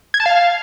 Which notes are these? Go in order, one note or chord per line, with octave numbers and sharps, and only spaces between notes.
G#6
A5
F5